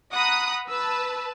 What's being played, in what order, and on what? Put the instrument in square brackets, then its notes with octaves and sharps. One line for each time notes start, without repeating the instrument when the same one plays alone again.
[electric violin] F#5 B5 [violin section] A#5 D#6 F#6
[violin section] B4 A5 [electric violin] E6